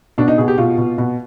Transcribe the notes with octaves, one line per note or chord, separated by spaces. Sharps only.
B2 D4
D#4
B2 G#4
G4
B2 F4
B2
B2